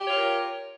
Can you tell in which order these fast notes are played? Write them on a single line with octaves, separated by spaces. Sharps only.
G4 C#5 F4 A#4